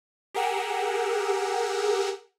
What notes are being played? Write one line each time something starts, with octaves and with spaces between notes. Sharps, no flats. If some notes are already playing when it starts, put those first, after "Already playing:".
G4 G#4 A#4 F#5 E6